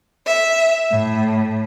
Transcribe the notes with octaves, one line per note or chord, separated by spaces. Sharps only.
E5
A2